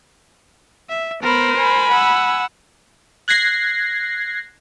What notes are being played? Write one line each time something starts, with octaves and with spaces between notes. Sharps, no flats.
E5
B3 A#4 C5 B5
G#5 B5
F#5 E6
F#6 G#6 A#6 C7